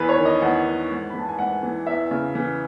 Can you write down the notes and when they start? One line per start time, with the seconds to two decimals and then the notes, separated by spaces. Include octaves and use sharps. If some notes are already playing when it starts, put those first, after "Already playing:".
Already playing: E2 E3 B4
0.09 C#5
0.18 D#3
0.25 D#5
0.42 E2 F#5
0.65 D#3
0.91 G#2
1.10 E3 B5
1.19 A5
1.29 G#5
1.39 G#2 F#5
1.63 E3
1.87 E2 E5
2.11 C#3
2.35 E3